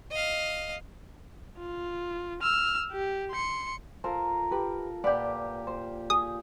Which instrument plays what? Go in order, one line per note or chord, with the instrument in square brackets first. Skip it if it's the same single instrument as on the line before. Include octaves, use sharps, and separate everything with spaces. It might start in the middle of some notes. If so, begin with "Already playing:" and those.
[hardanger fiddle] D#5 F5
[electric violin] F4
E6 F6
G4
C6 C#7
[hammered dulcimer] F4 A4 A#4 [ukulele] C5
[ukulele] G4 B4
[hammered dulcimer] A#2 G4 [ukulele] B4 D5 F#5
[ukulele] C5
[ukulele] G#4 [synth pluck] D#6